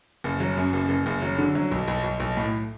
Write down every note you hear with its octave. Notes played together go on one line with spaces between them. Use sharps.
F#1
F#3
F#2
F#1
F#1
F#1
F#3
D3
F#3
B1
B1
B1
B1
A2